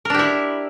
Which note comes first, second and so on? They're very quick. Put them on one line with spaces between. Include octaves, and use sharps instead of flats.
A#4 D4 G4 E4